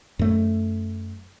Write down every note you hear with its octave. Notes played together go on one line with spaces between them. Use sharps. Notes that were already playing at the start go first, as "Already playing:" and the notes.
F#2 A3